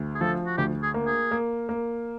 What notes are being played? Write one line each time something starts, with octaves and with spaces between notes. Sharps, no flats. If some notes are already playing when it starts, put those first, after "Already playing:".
Already playing: D2
G#4
F3 A4
F#4
D2 G4
G#4
A#3
G#4
A#3
A#3